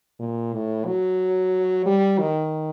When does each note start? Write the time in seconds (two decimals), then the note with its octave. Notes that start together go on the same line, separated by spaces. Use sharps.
0.20 A#2
0.53 A2
0.86 F#3
1.85 G3
2.19 D#3